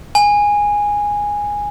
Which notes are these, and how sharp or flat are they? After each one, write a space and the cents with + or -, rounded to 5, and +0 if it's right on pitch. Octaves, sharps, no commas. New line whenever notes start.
G#5 -10